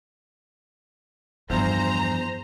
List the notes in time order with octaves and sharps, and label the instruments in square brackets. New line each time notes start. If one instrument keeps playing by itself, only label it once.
[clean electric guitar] E2 [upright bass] G2 F3 [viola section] C5 A#5